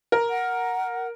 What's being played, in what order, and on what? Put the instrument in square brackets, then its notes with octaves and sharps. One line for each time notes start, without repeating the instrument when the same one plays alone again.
[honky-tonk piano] A#4
[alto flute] F#5